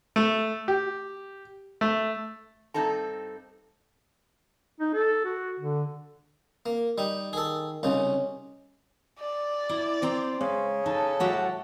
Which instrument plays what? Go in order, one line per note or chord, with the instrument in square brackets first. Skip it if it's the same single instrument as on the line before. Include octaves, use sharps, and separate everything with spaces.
[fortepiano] A3
G4
A3
[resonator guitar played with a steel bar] G2 C4 D#4 A4 A#5
[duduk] D#4
A4
F#4
D3
[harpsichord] A#3
G3 D#4
[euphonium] D#3 [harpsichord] G#4 A4
[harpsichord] C2 C#3 D#4 [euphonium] C#4
[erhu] D5
[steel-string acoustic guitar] E4
[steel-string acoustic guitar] C4 G5 A#5 [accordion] C5
[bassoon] C#3 [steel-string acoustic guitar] G#3
[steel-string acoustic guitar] D#4 [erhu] A4 [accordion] A5
[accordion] A2 F#5 [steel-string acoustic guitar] F#3 F#4 G4